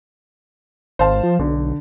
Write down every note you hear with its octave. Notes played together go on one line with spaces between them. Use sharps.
G#1 C5 F5 A5
F3
B1 D3